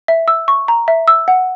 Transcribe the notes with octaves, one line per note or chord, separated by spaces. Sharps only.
E5
E6
C#6
A#5
E5
E6
F#5